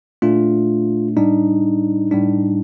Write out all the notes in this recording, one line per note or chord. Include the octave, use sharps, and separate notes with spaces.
A#2 A3 D4 F4
A2 G3 D4 D#4
A2 G3 D4